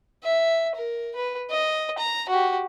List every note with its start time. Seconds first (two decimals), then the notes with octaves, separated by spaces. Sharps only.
0.24 E5
0.76 A#4
1.15 B4
1.51 D#5
1.98 A#5
2.29 F#4 G4